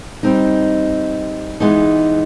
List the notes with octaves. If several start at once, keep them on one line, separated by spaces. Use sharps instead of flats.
G3 C4 D#4
E3 G#3 B3 D#4